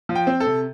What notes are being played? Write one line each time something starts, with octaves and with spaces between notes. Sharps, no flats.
F3
G5
C4
A4
C3